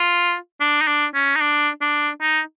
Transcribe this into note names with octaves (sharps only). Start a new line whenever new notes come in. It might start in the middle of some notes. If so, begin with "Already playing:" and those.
Already playing: F4
D4
D#4
D4
C#4
D#4
D4
D4
D#4